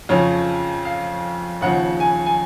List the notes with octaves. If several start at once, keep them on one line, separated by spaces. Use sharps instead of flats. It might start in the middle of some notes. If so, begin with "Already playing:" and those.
F2 C#3 F3 C#5
F5
D#2 C#3 F3 F#5
G#5
G#5